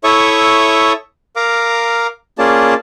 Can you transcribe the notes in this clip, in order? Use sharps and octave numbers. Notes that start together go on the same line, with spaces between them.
E4 A4 C#5 E5 C#6 D#6
A#4 F5 A#5 D6
A#3 C#4 F4 G#4 D5 A5